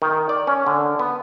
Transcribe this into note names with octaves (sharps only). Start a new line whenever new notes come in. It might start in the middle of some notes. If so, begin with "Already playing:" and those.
D#3
D5
C#4
D3
B3